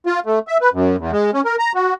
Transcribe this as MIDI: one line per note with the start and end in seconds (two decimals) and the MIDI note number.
0.06 0.20 65
0.26 0.39 57
0.48 0.58 76
0.61 0.70 71
0.73 0.96 42
0.99 1.11 40
1.12 1.31 56
1.34 1.41 61
1.45 1.56 70
1.59 1.72 82
1.75 1.94 66